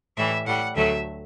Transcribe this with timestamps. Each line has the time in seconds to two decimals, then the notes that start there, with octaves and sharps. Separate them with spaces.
0.17 A2 E3 G3 E5
0.47 A2 G3 F#5
0.76 D2 D3 F#3 A3 E5